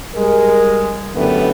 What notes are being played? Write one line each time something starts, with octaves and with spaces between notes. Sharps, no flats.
G3 G#3 A#4
F#2 D3 E3 G3 A3 B3